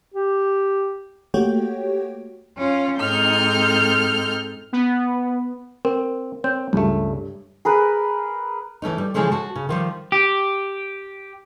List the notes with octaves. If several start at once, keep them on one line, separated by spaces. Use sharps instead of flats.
G4
A3 A#3 F#4 G4 C#5 G5
C#4 F4
G#2 C4 D#4 A4 F6 G6
B3
C4 A#4
C4 C#5
C#2 G2 A3
G#4 A#4 B4
E3 A3 C#4 D#4
G3
C#3 E3 F3 G#3 A3 C#4
F#4 A5
C#3
D#3 F3 G3
G4